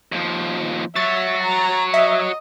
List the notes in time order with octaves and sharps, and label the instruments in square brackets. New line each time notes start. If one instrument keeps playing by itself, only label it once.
[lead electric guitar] D#2 F3
[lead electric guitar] F#4 C#5 [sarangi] E5 [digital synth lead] A6
[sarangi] A#5
[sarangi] D#5 [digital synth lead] E5